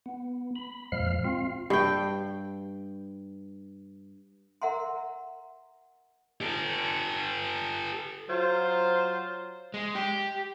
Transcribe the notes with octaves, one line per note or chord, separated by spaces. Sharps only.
B3
B5
F2 A#2 F3 G#3 F5 F6
C4 F4 F5
G2 G5
A#4 E5 F#5 A#5 C6
G4 A4
F#3 F4 C5
G#3
G4